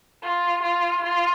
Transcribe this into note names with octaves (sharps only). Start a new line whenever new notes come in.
F4
F4
F4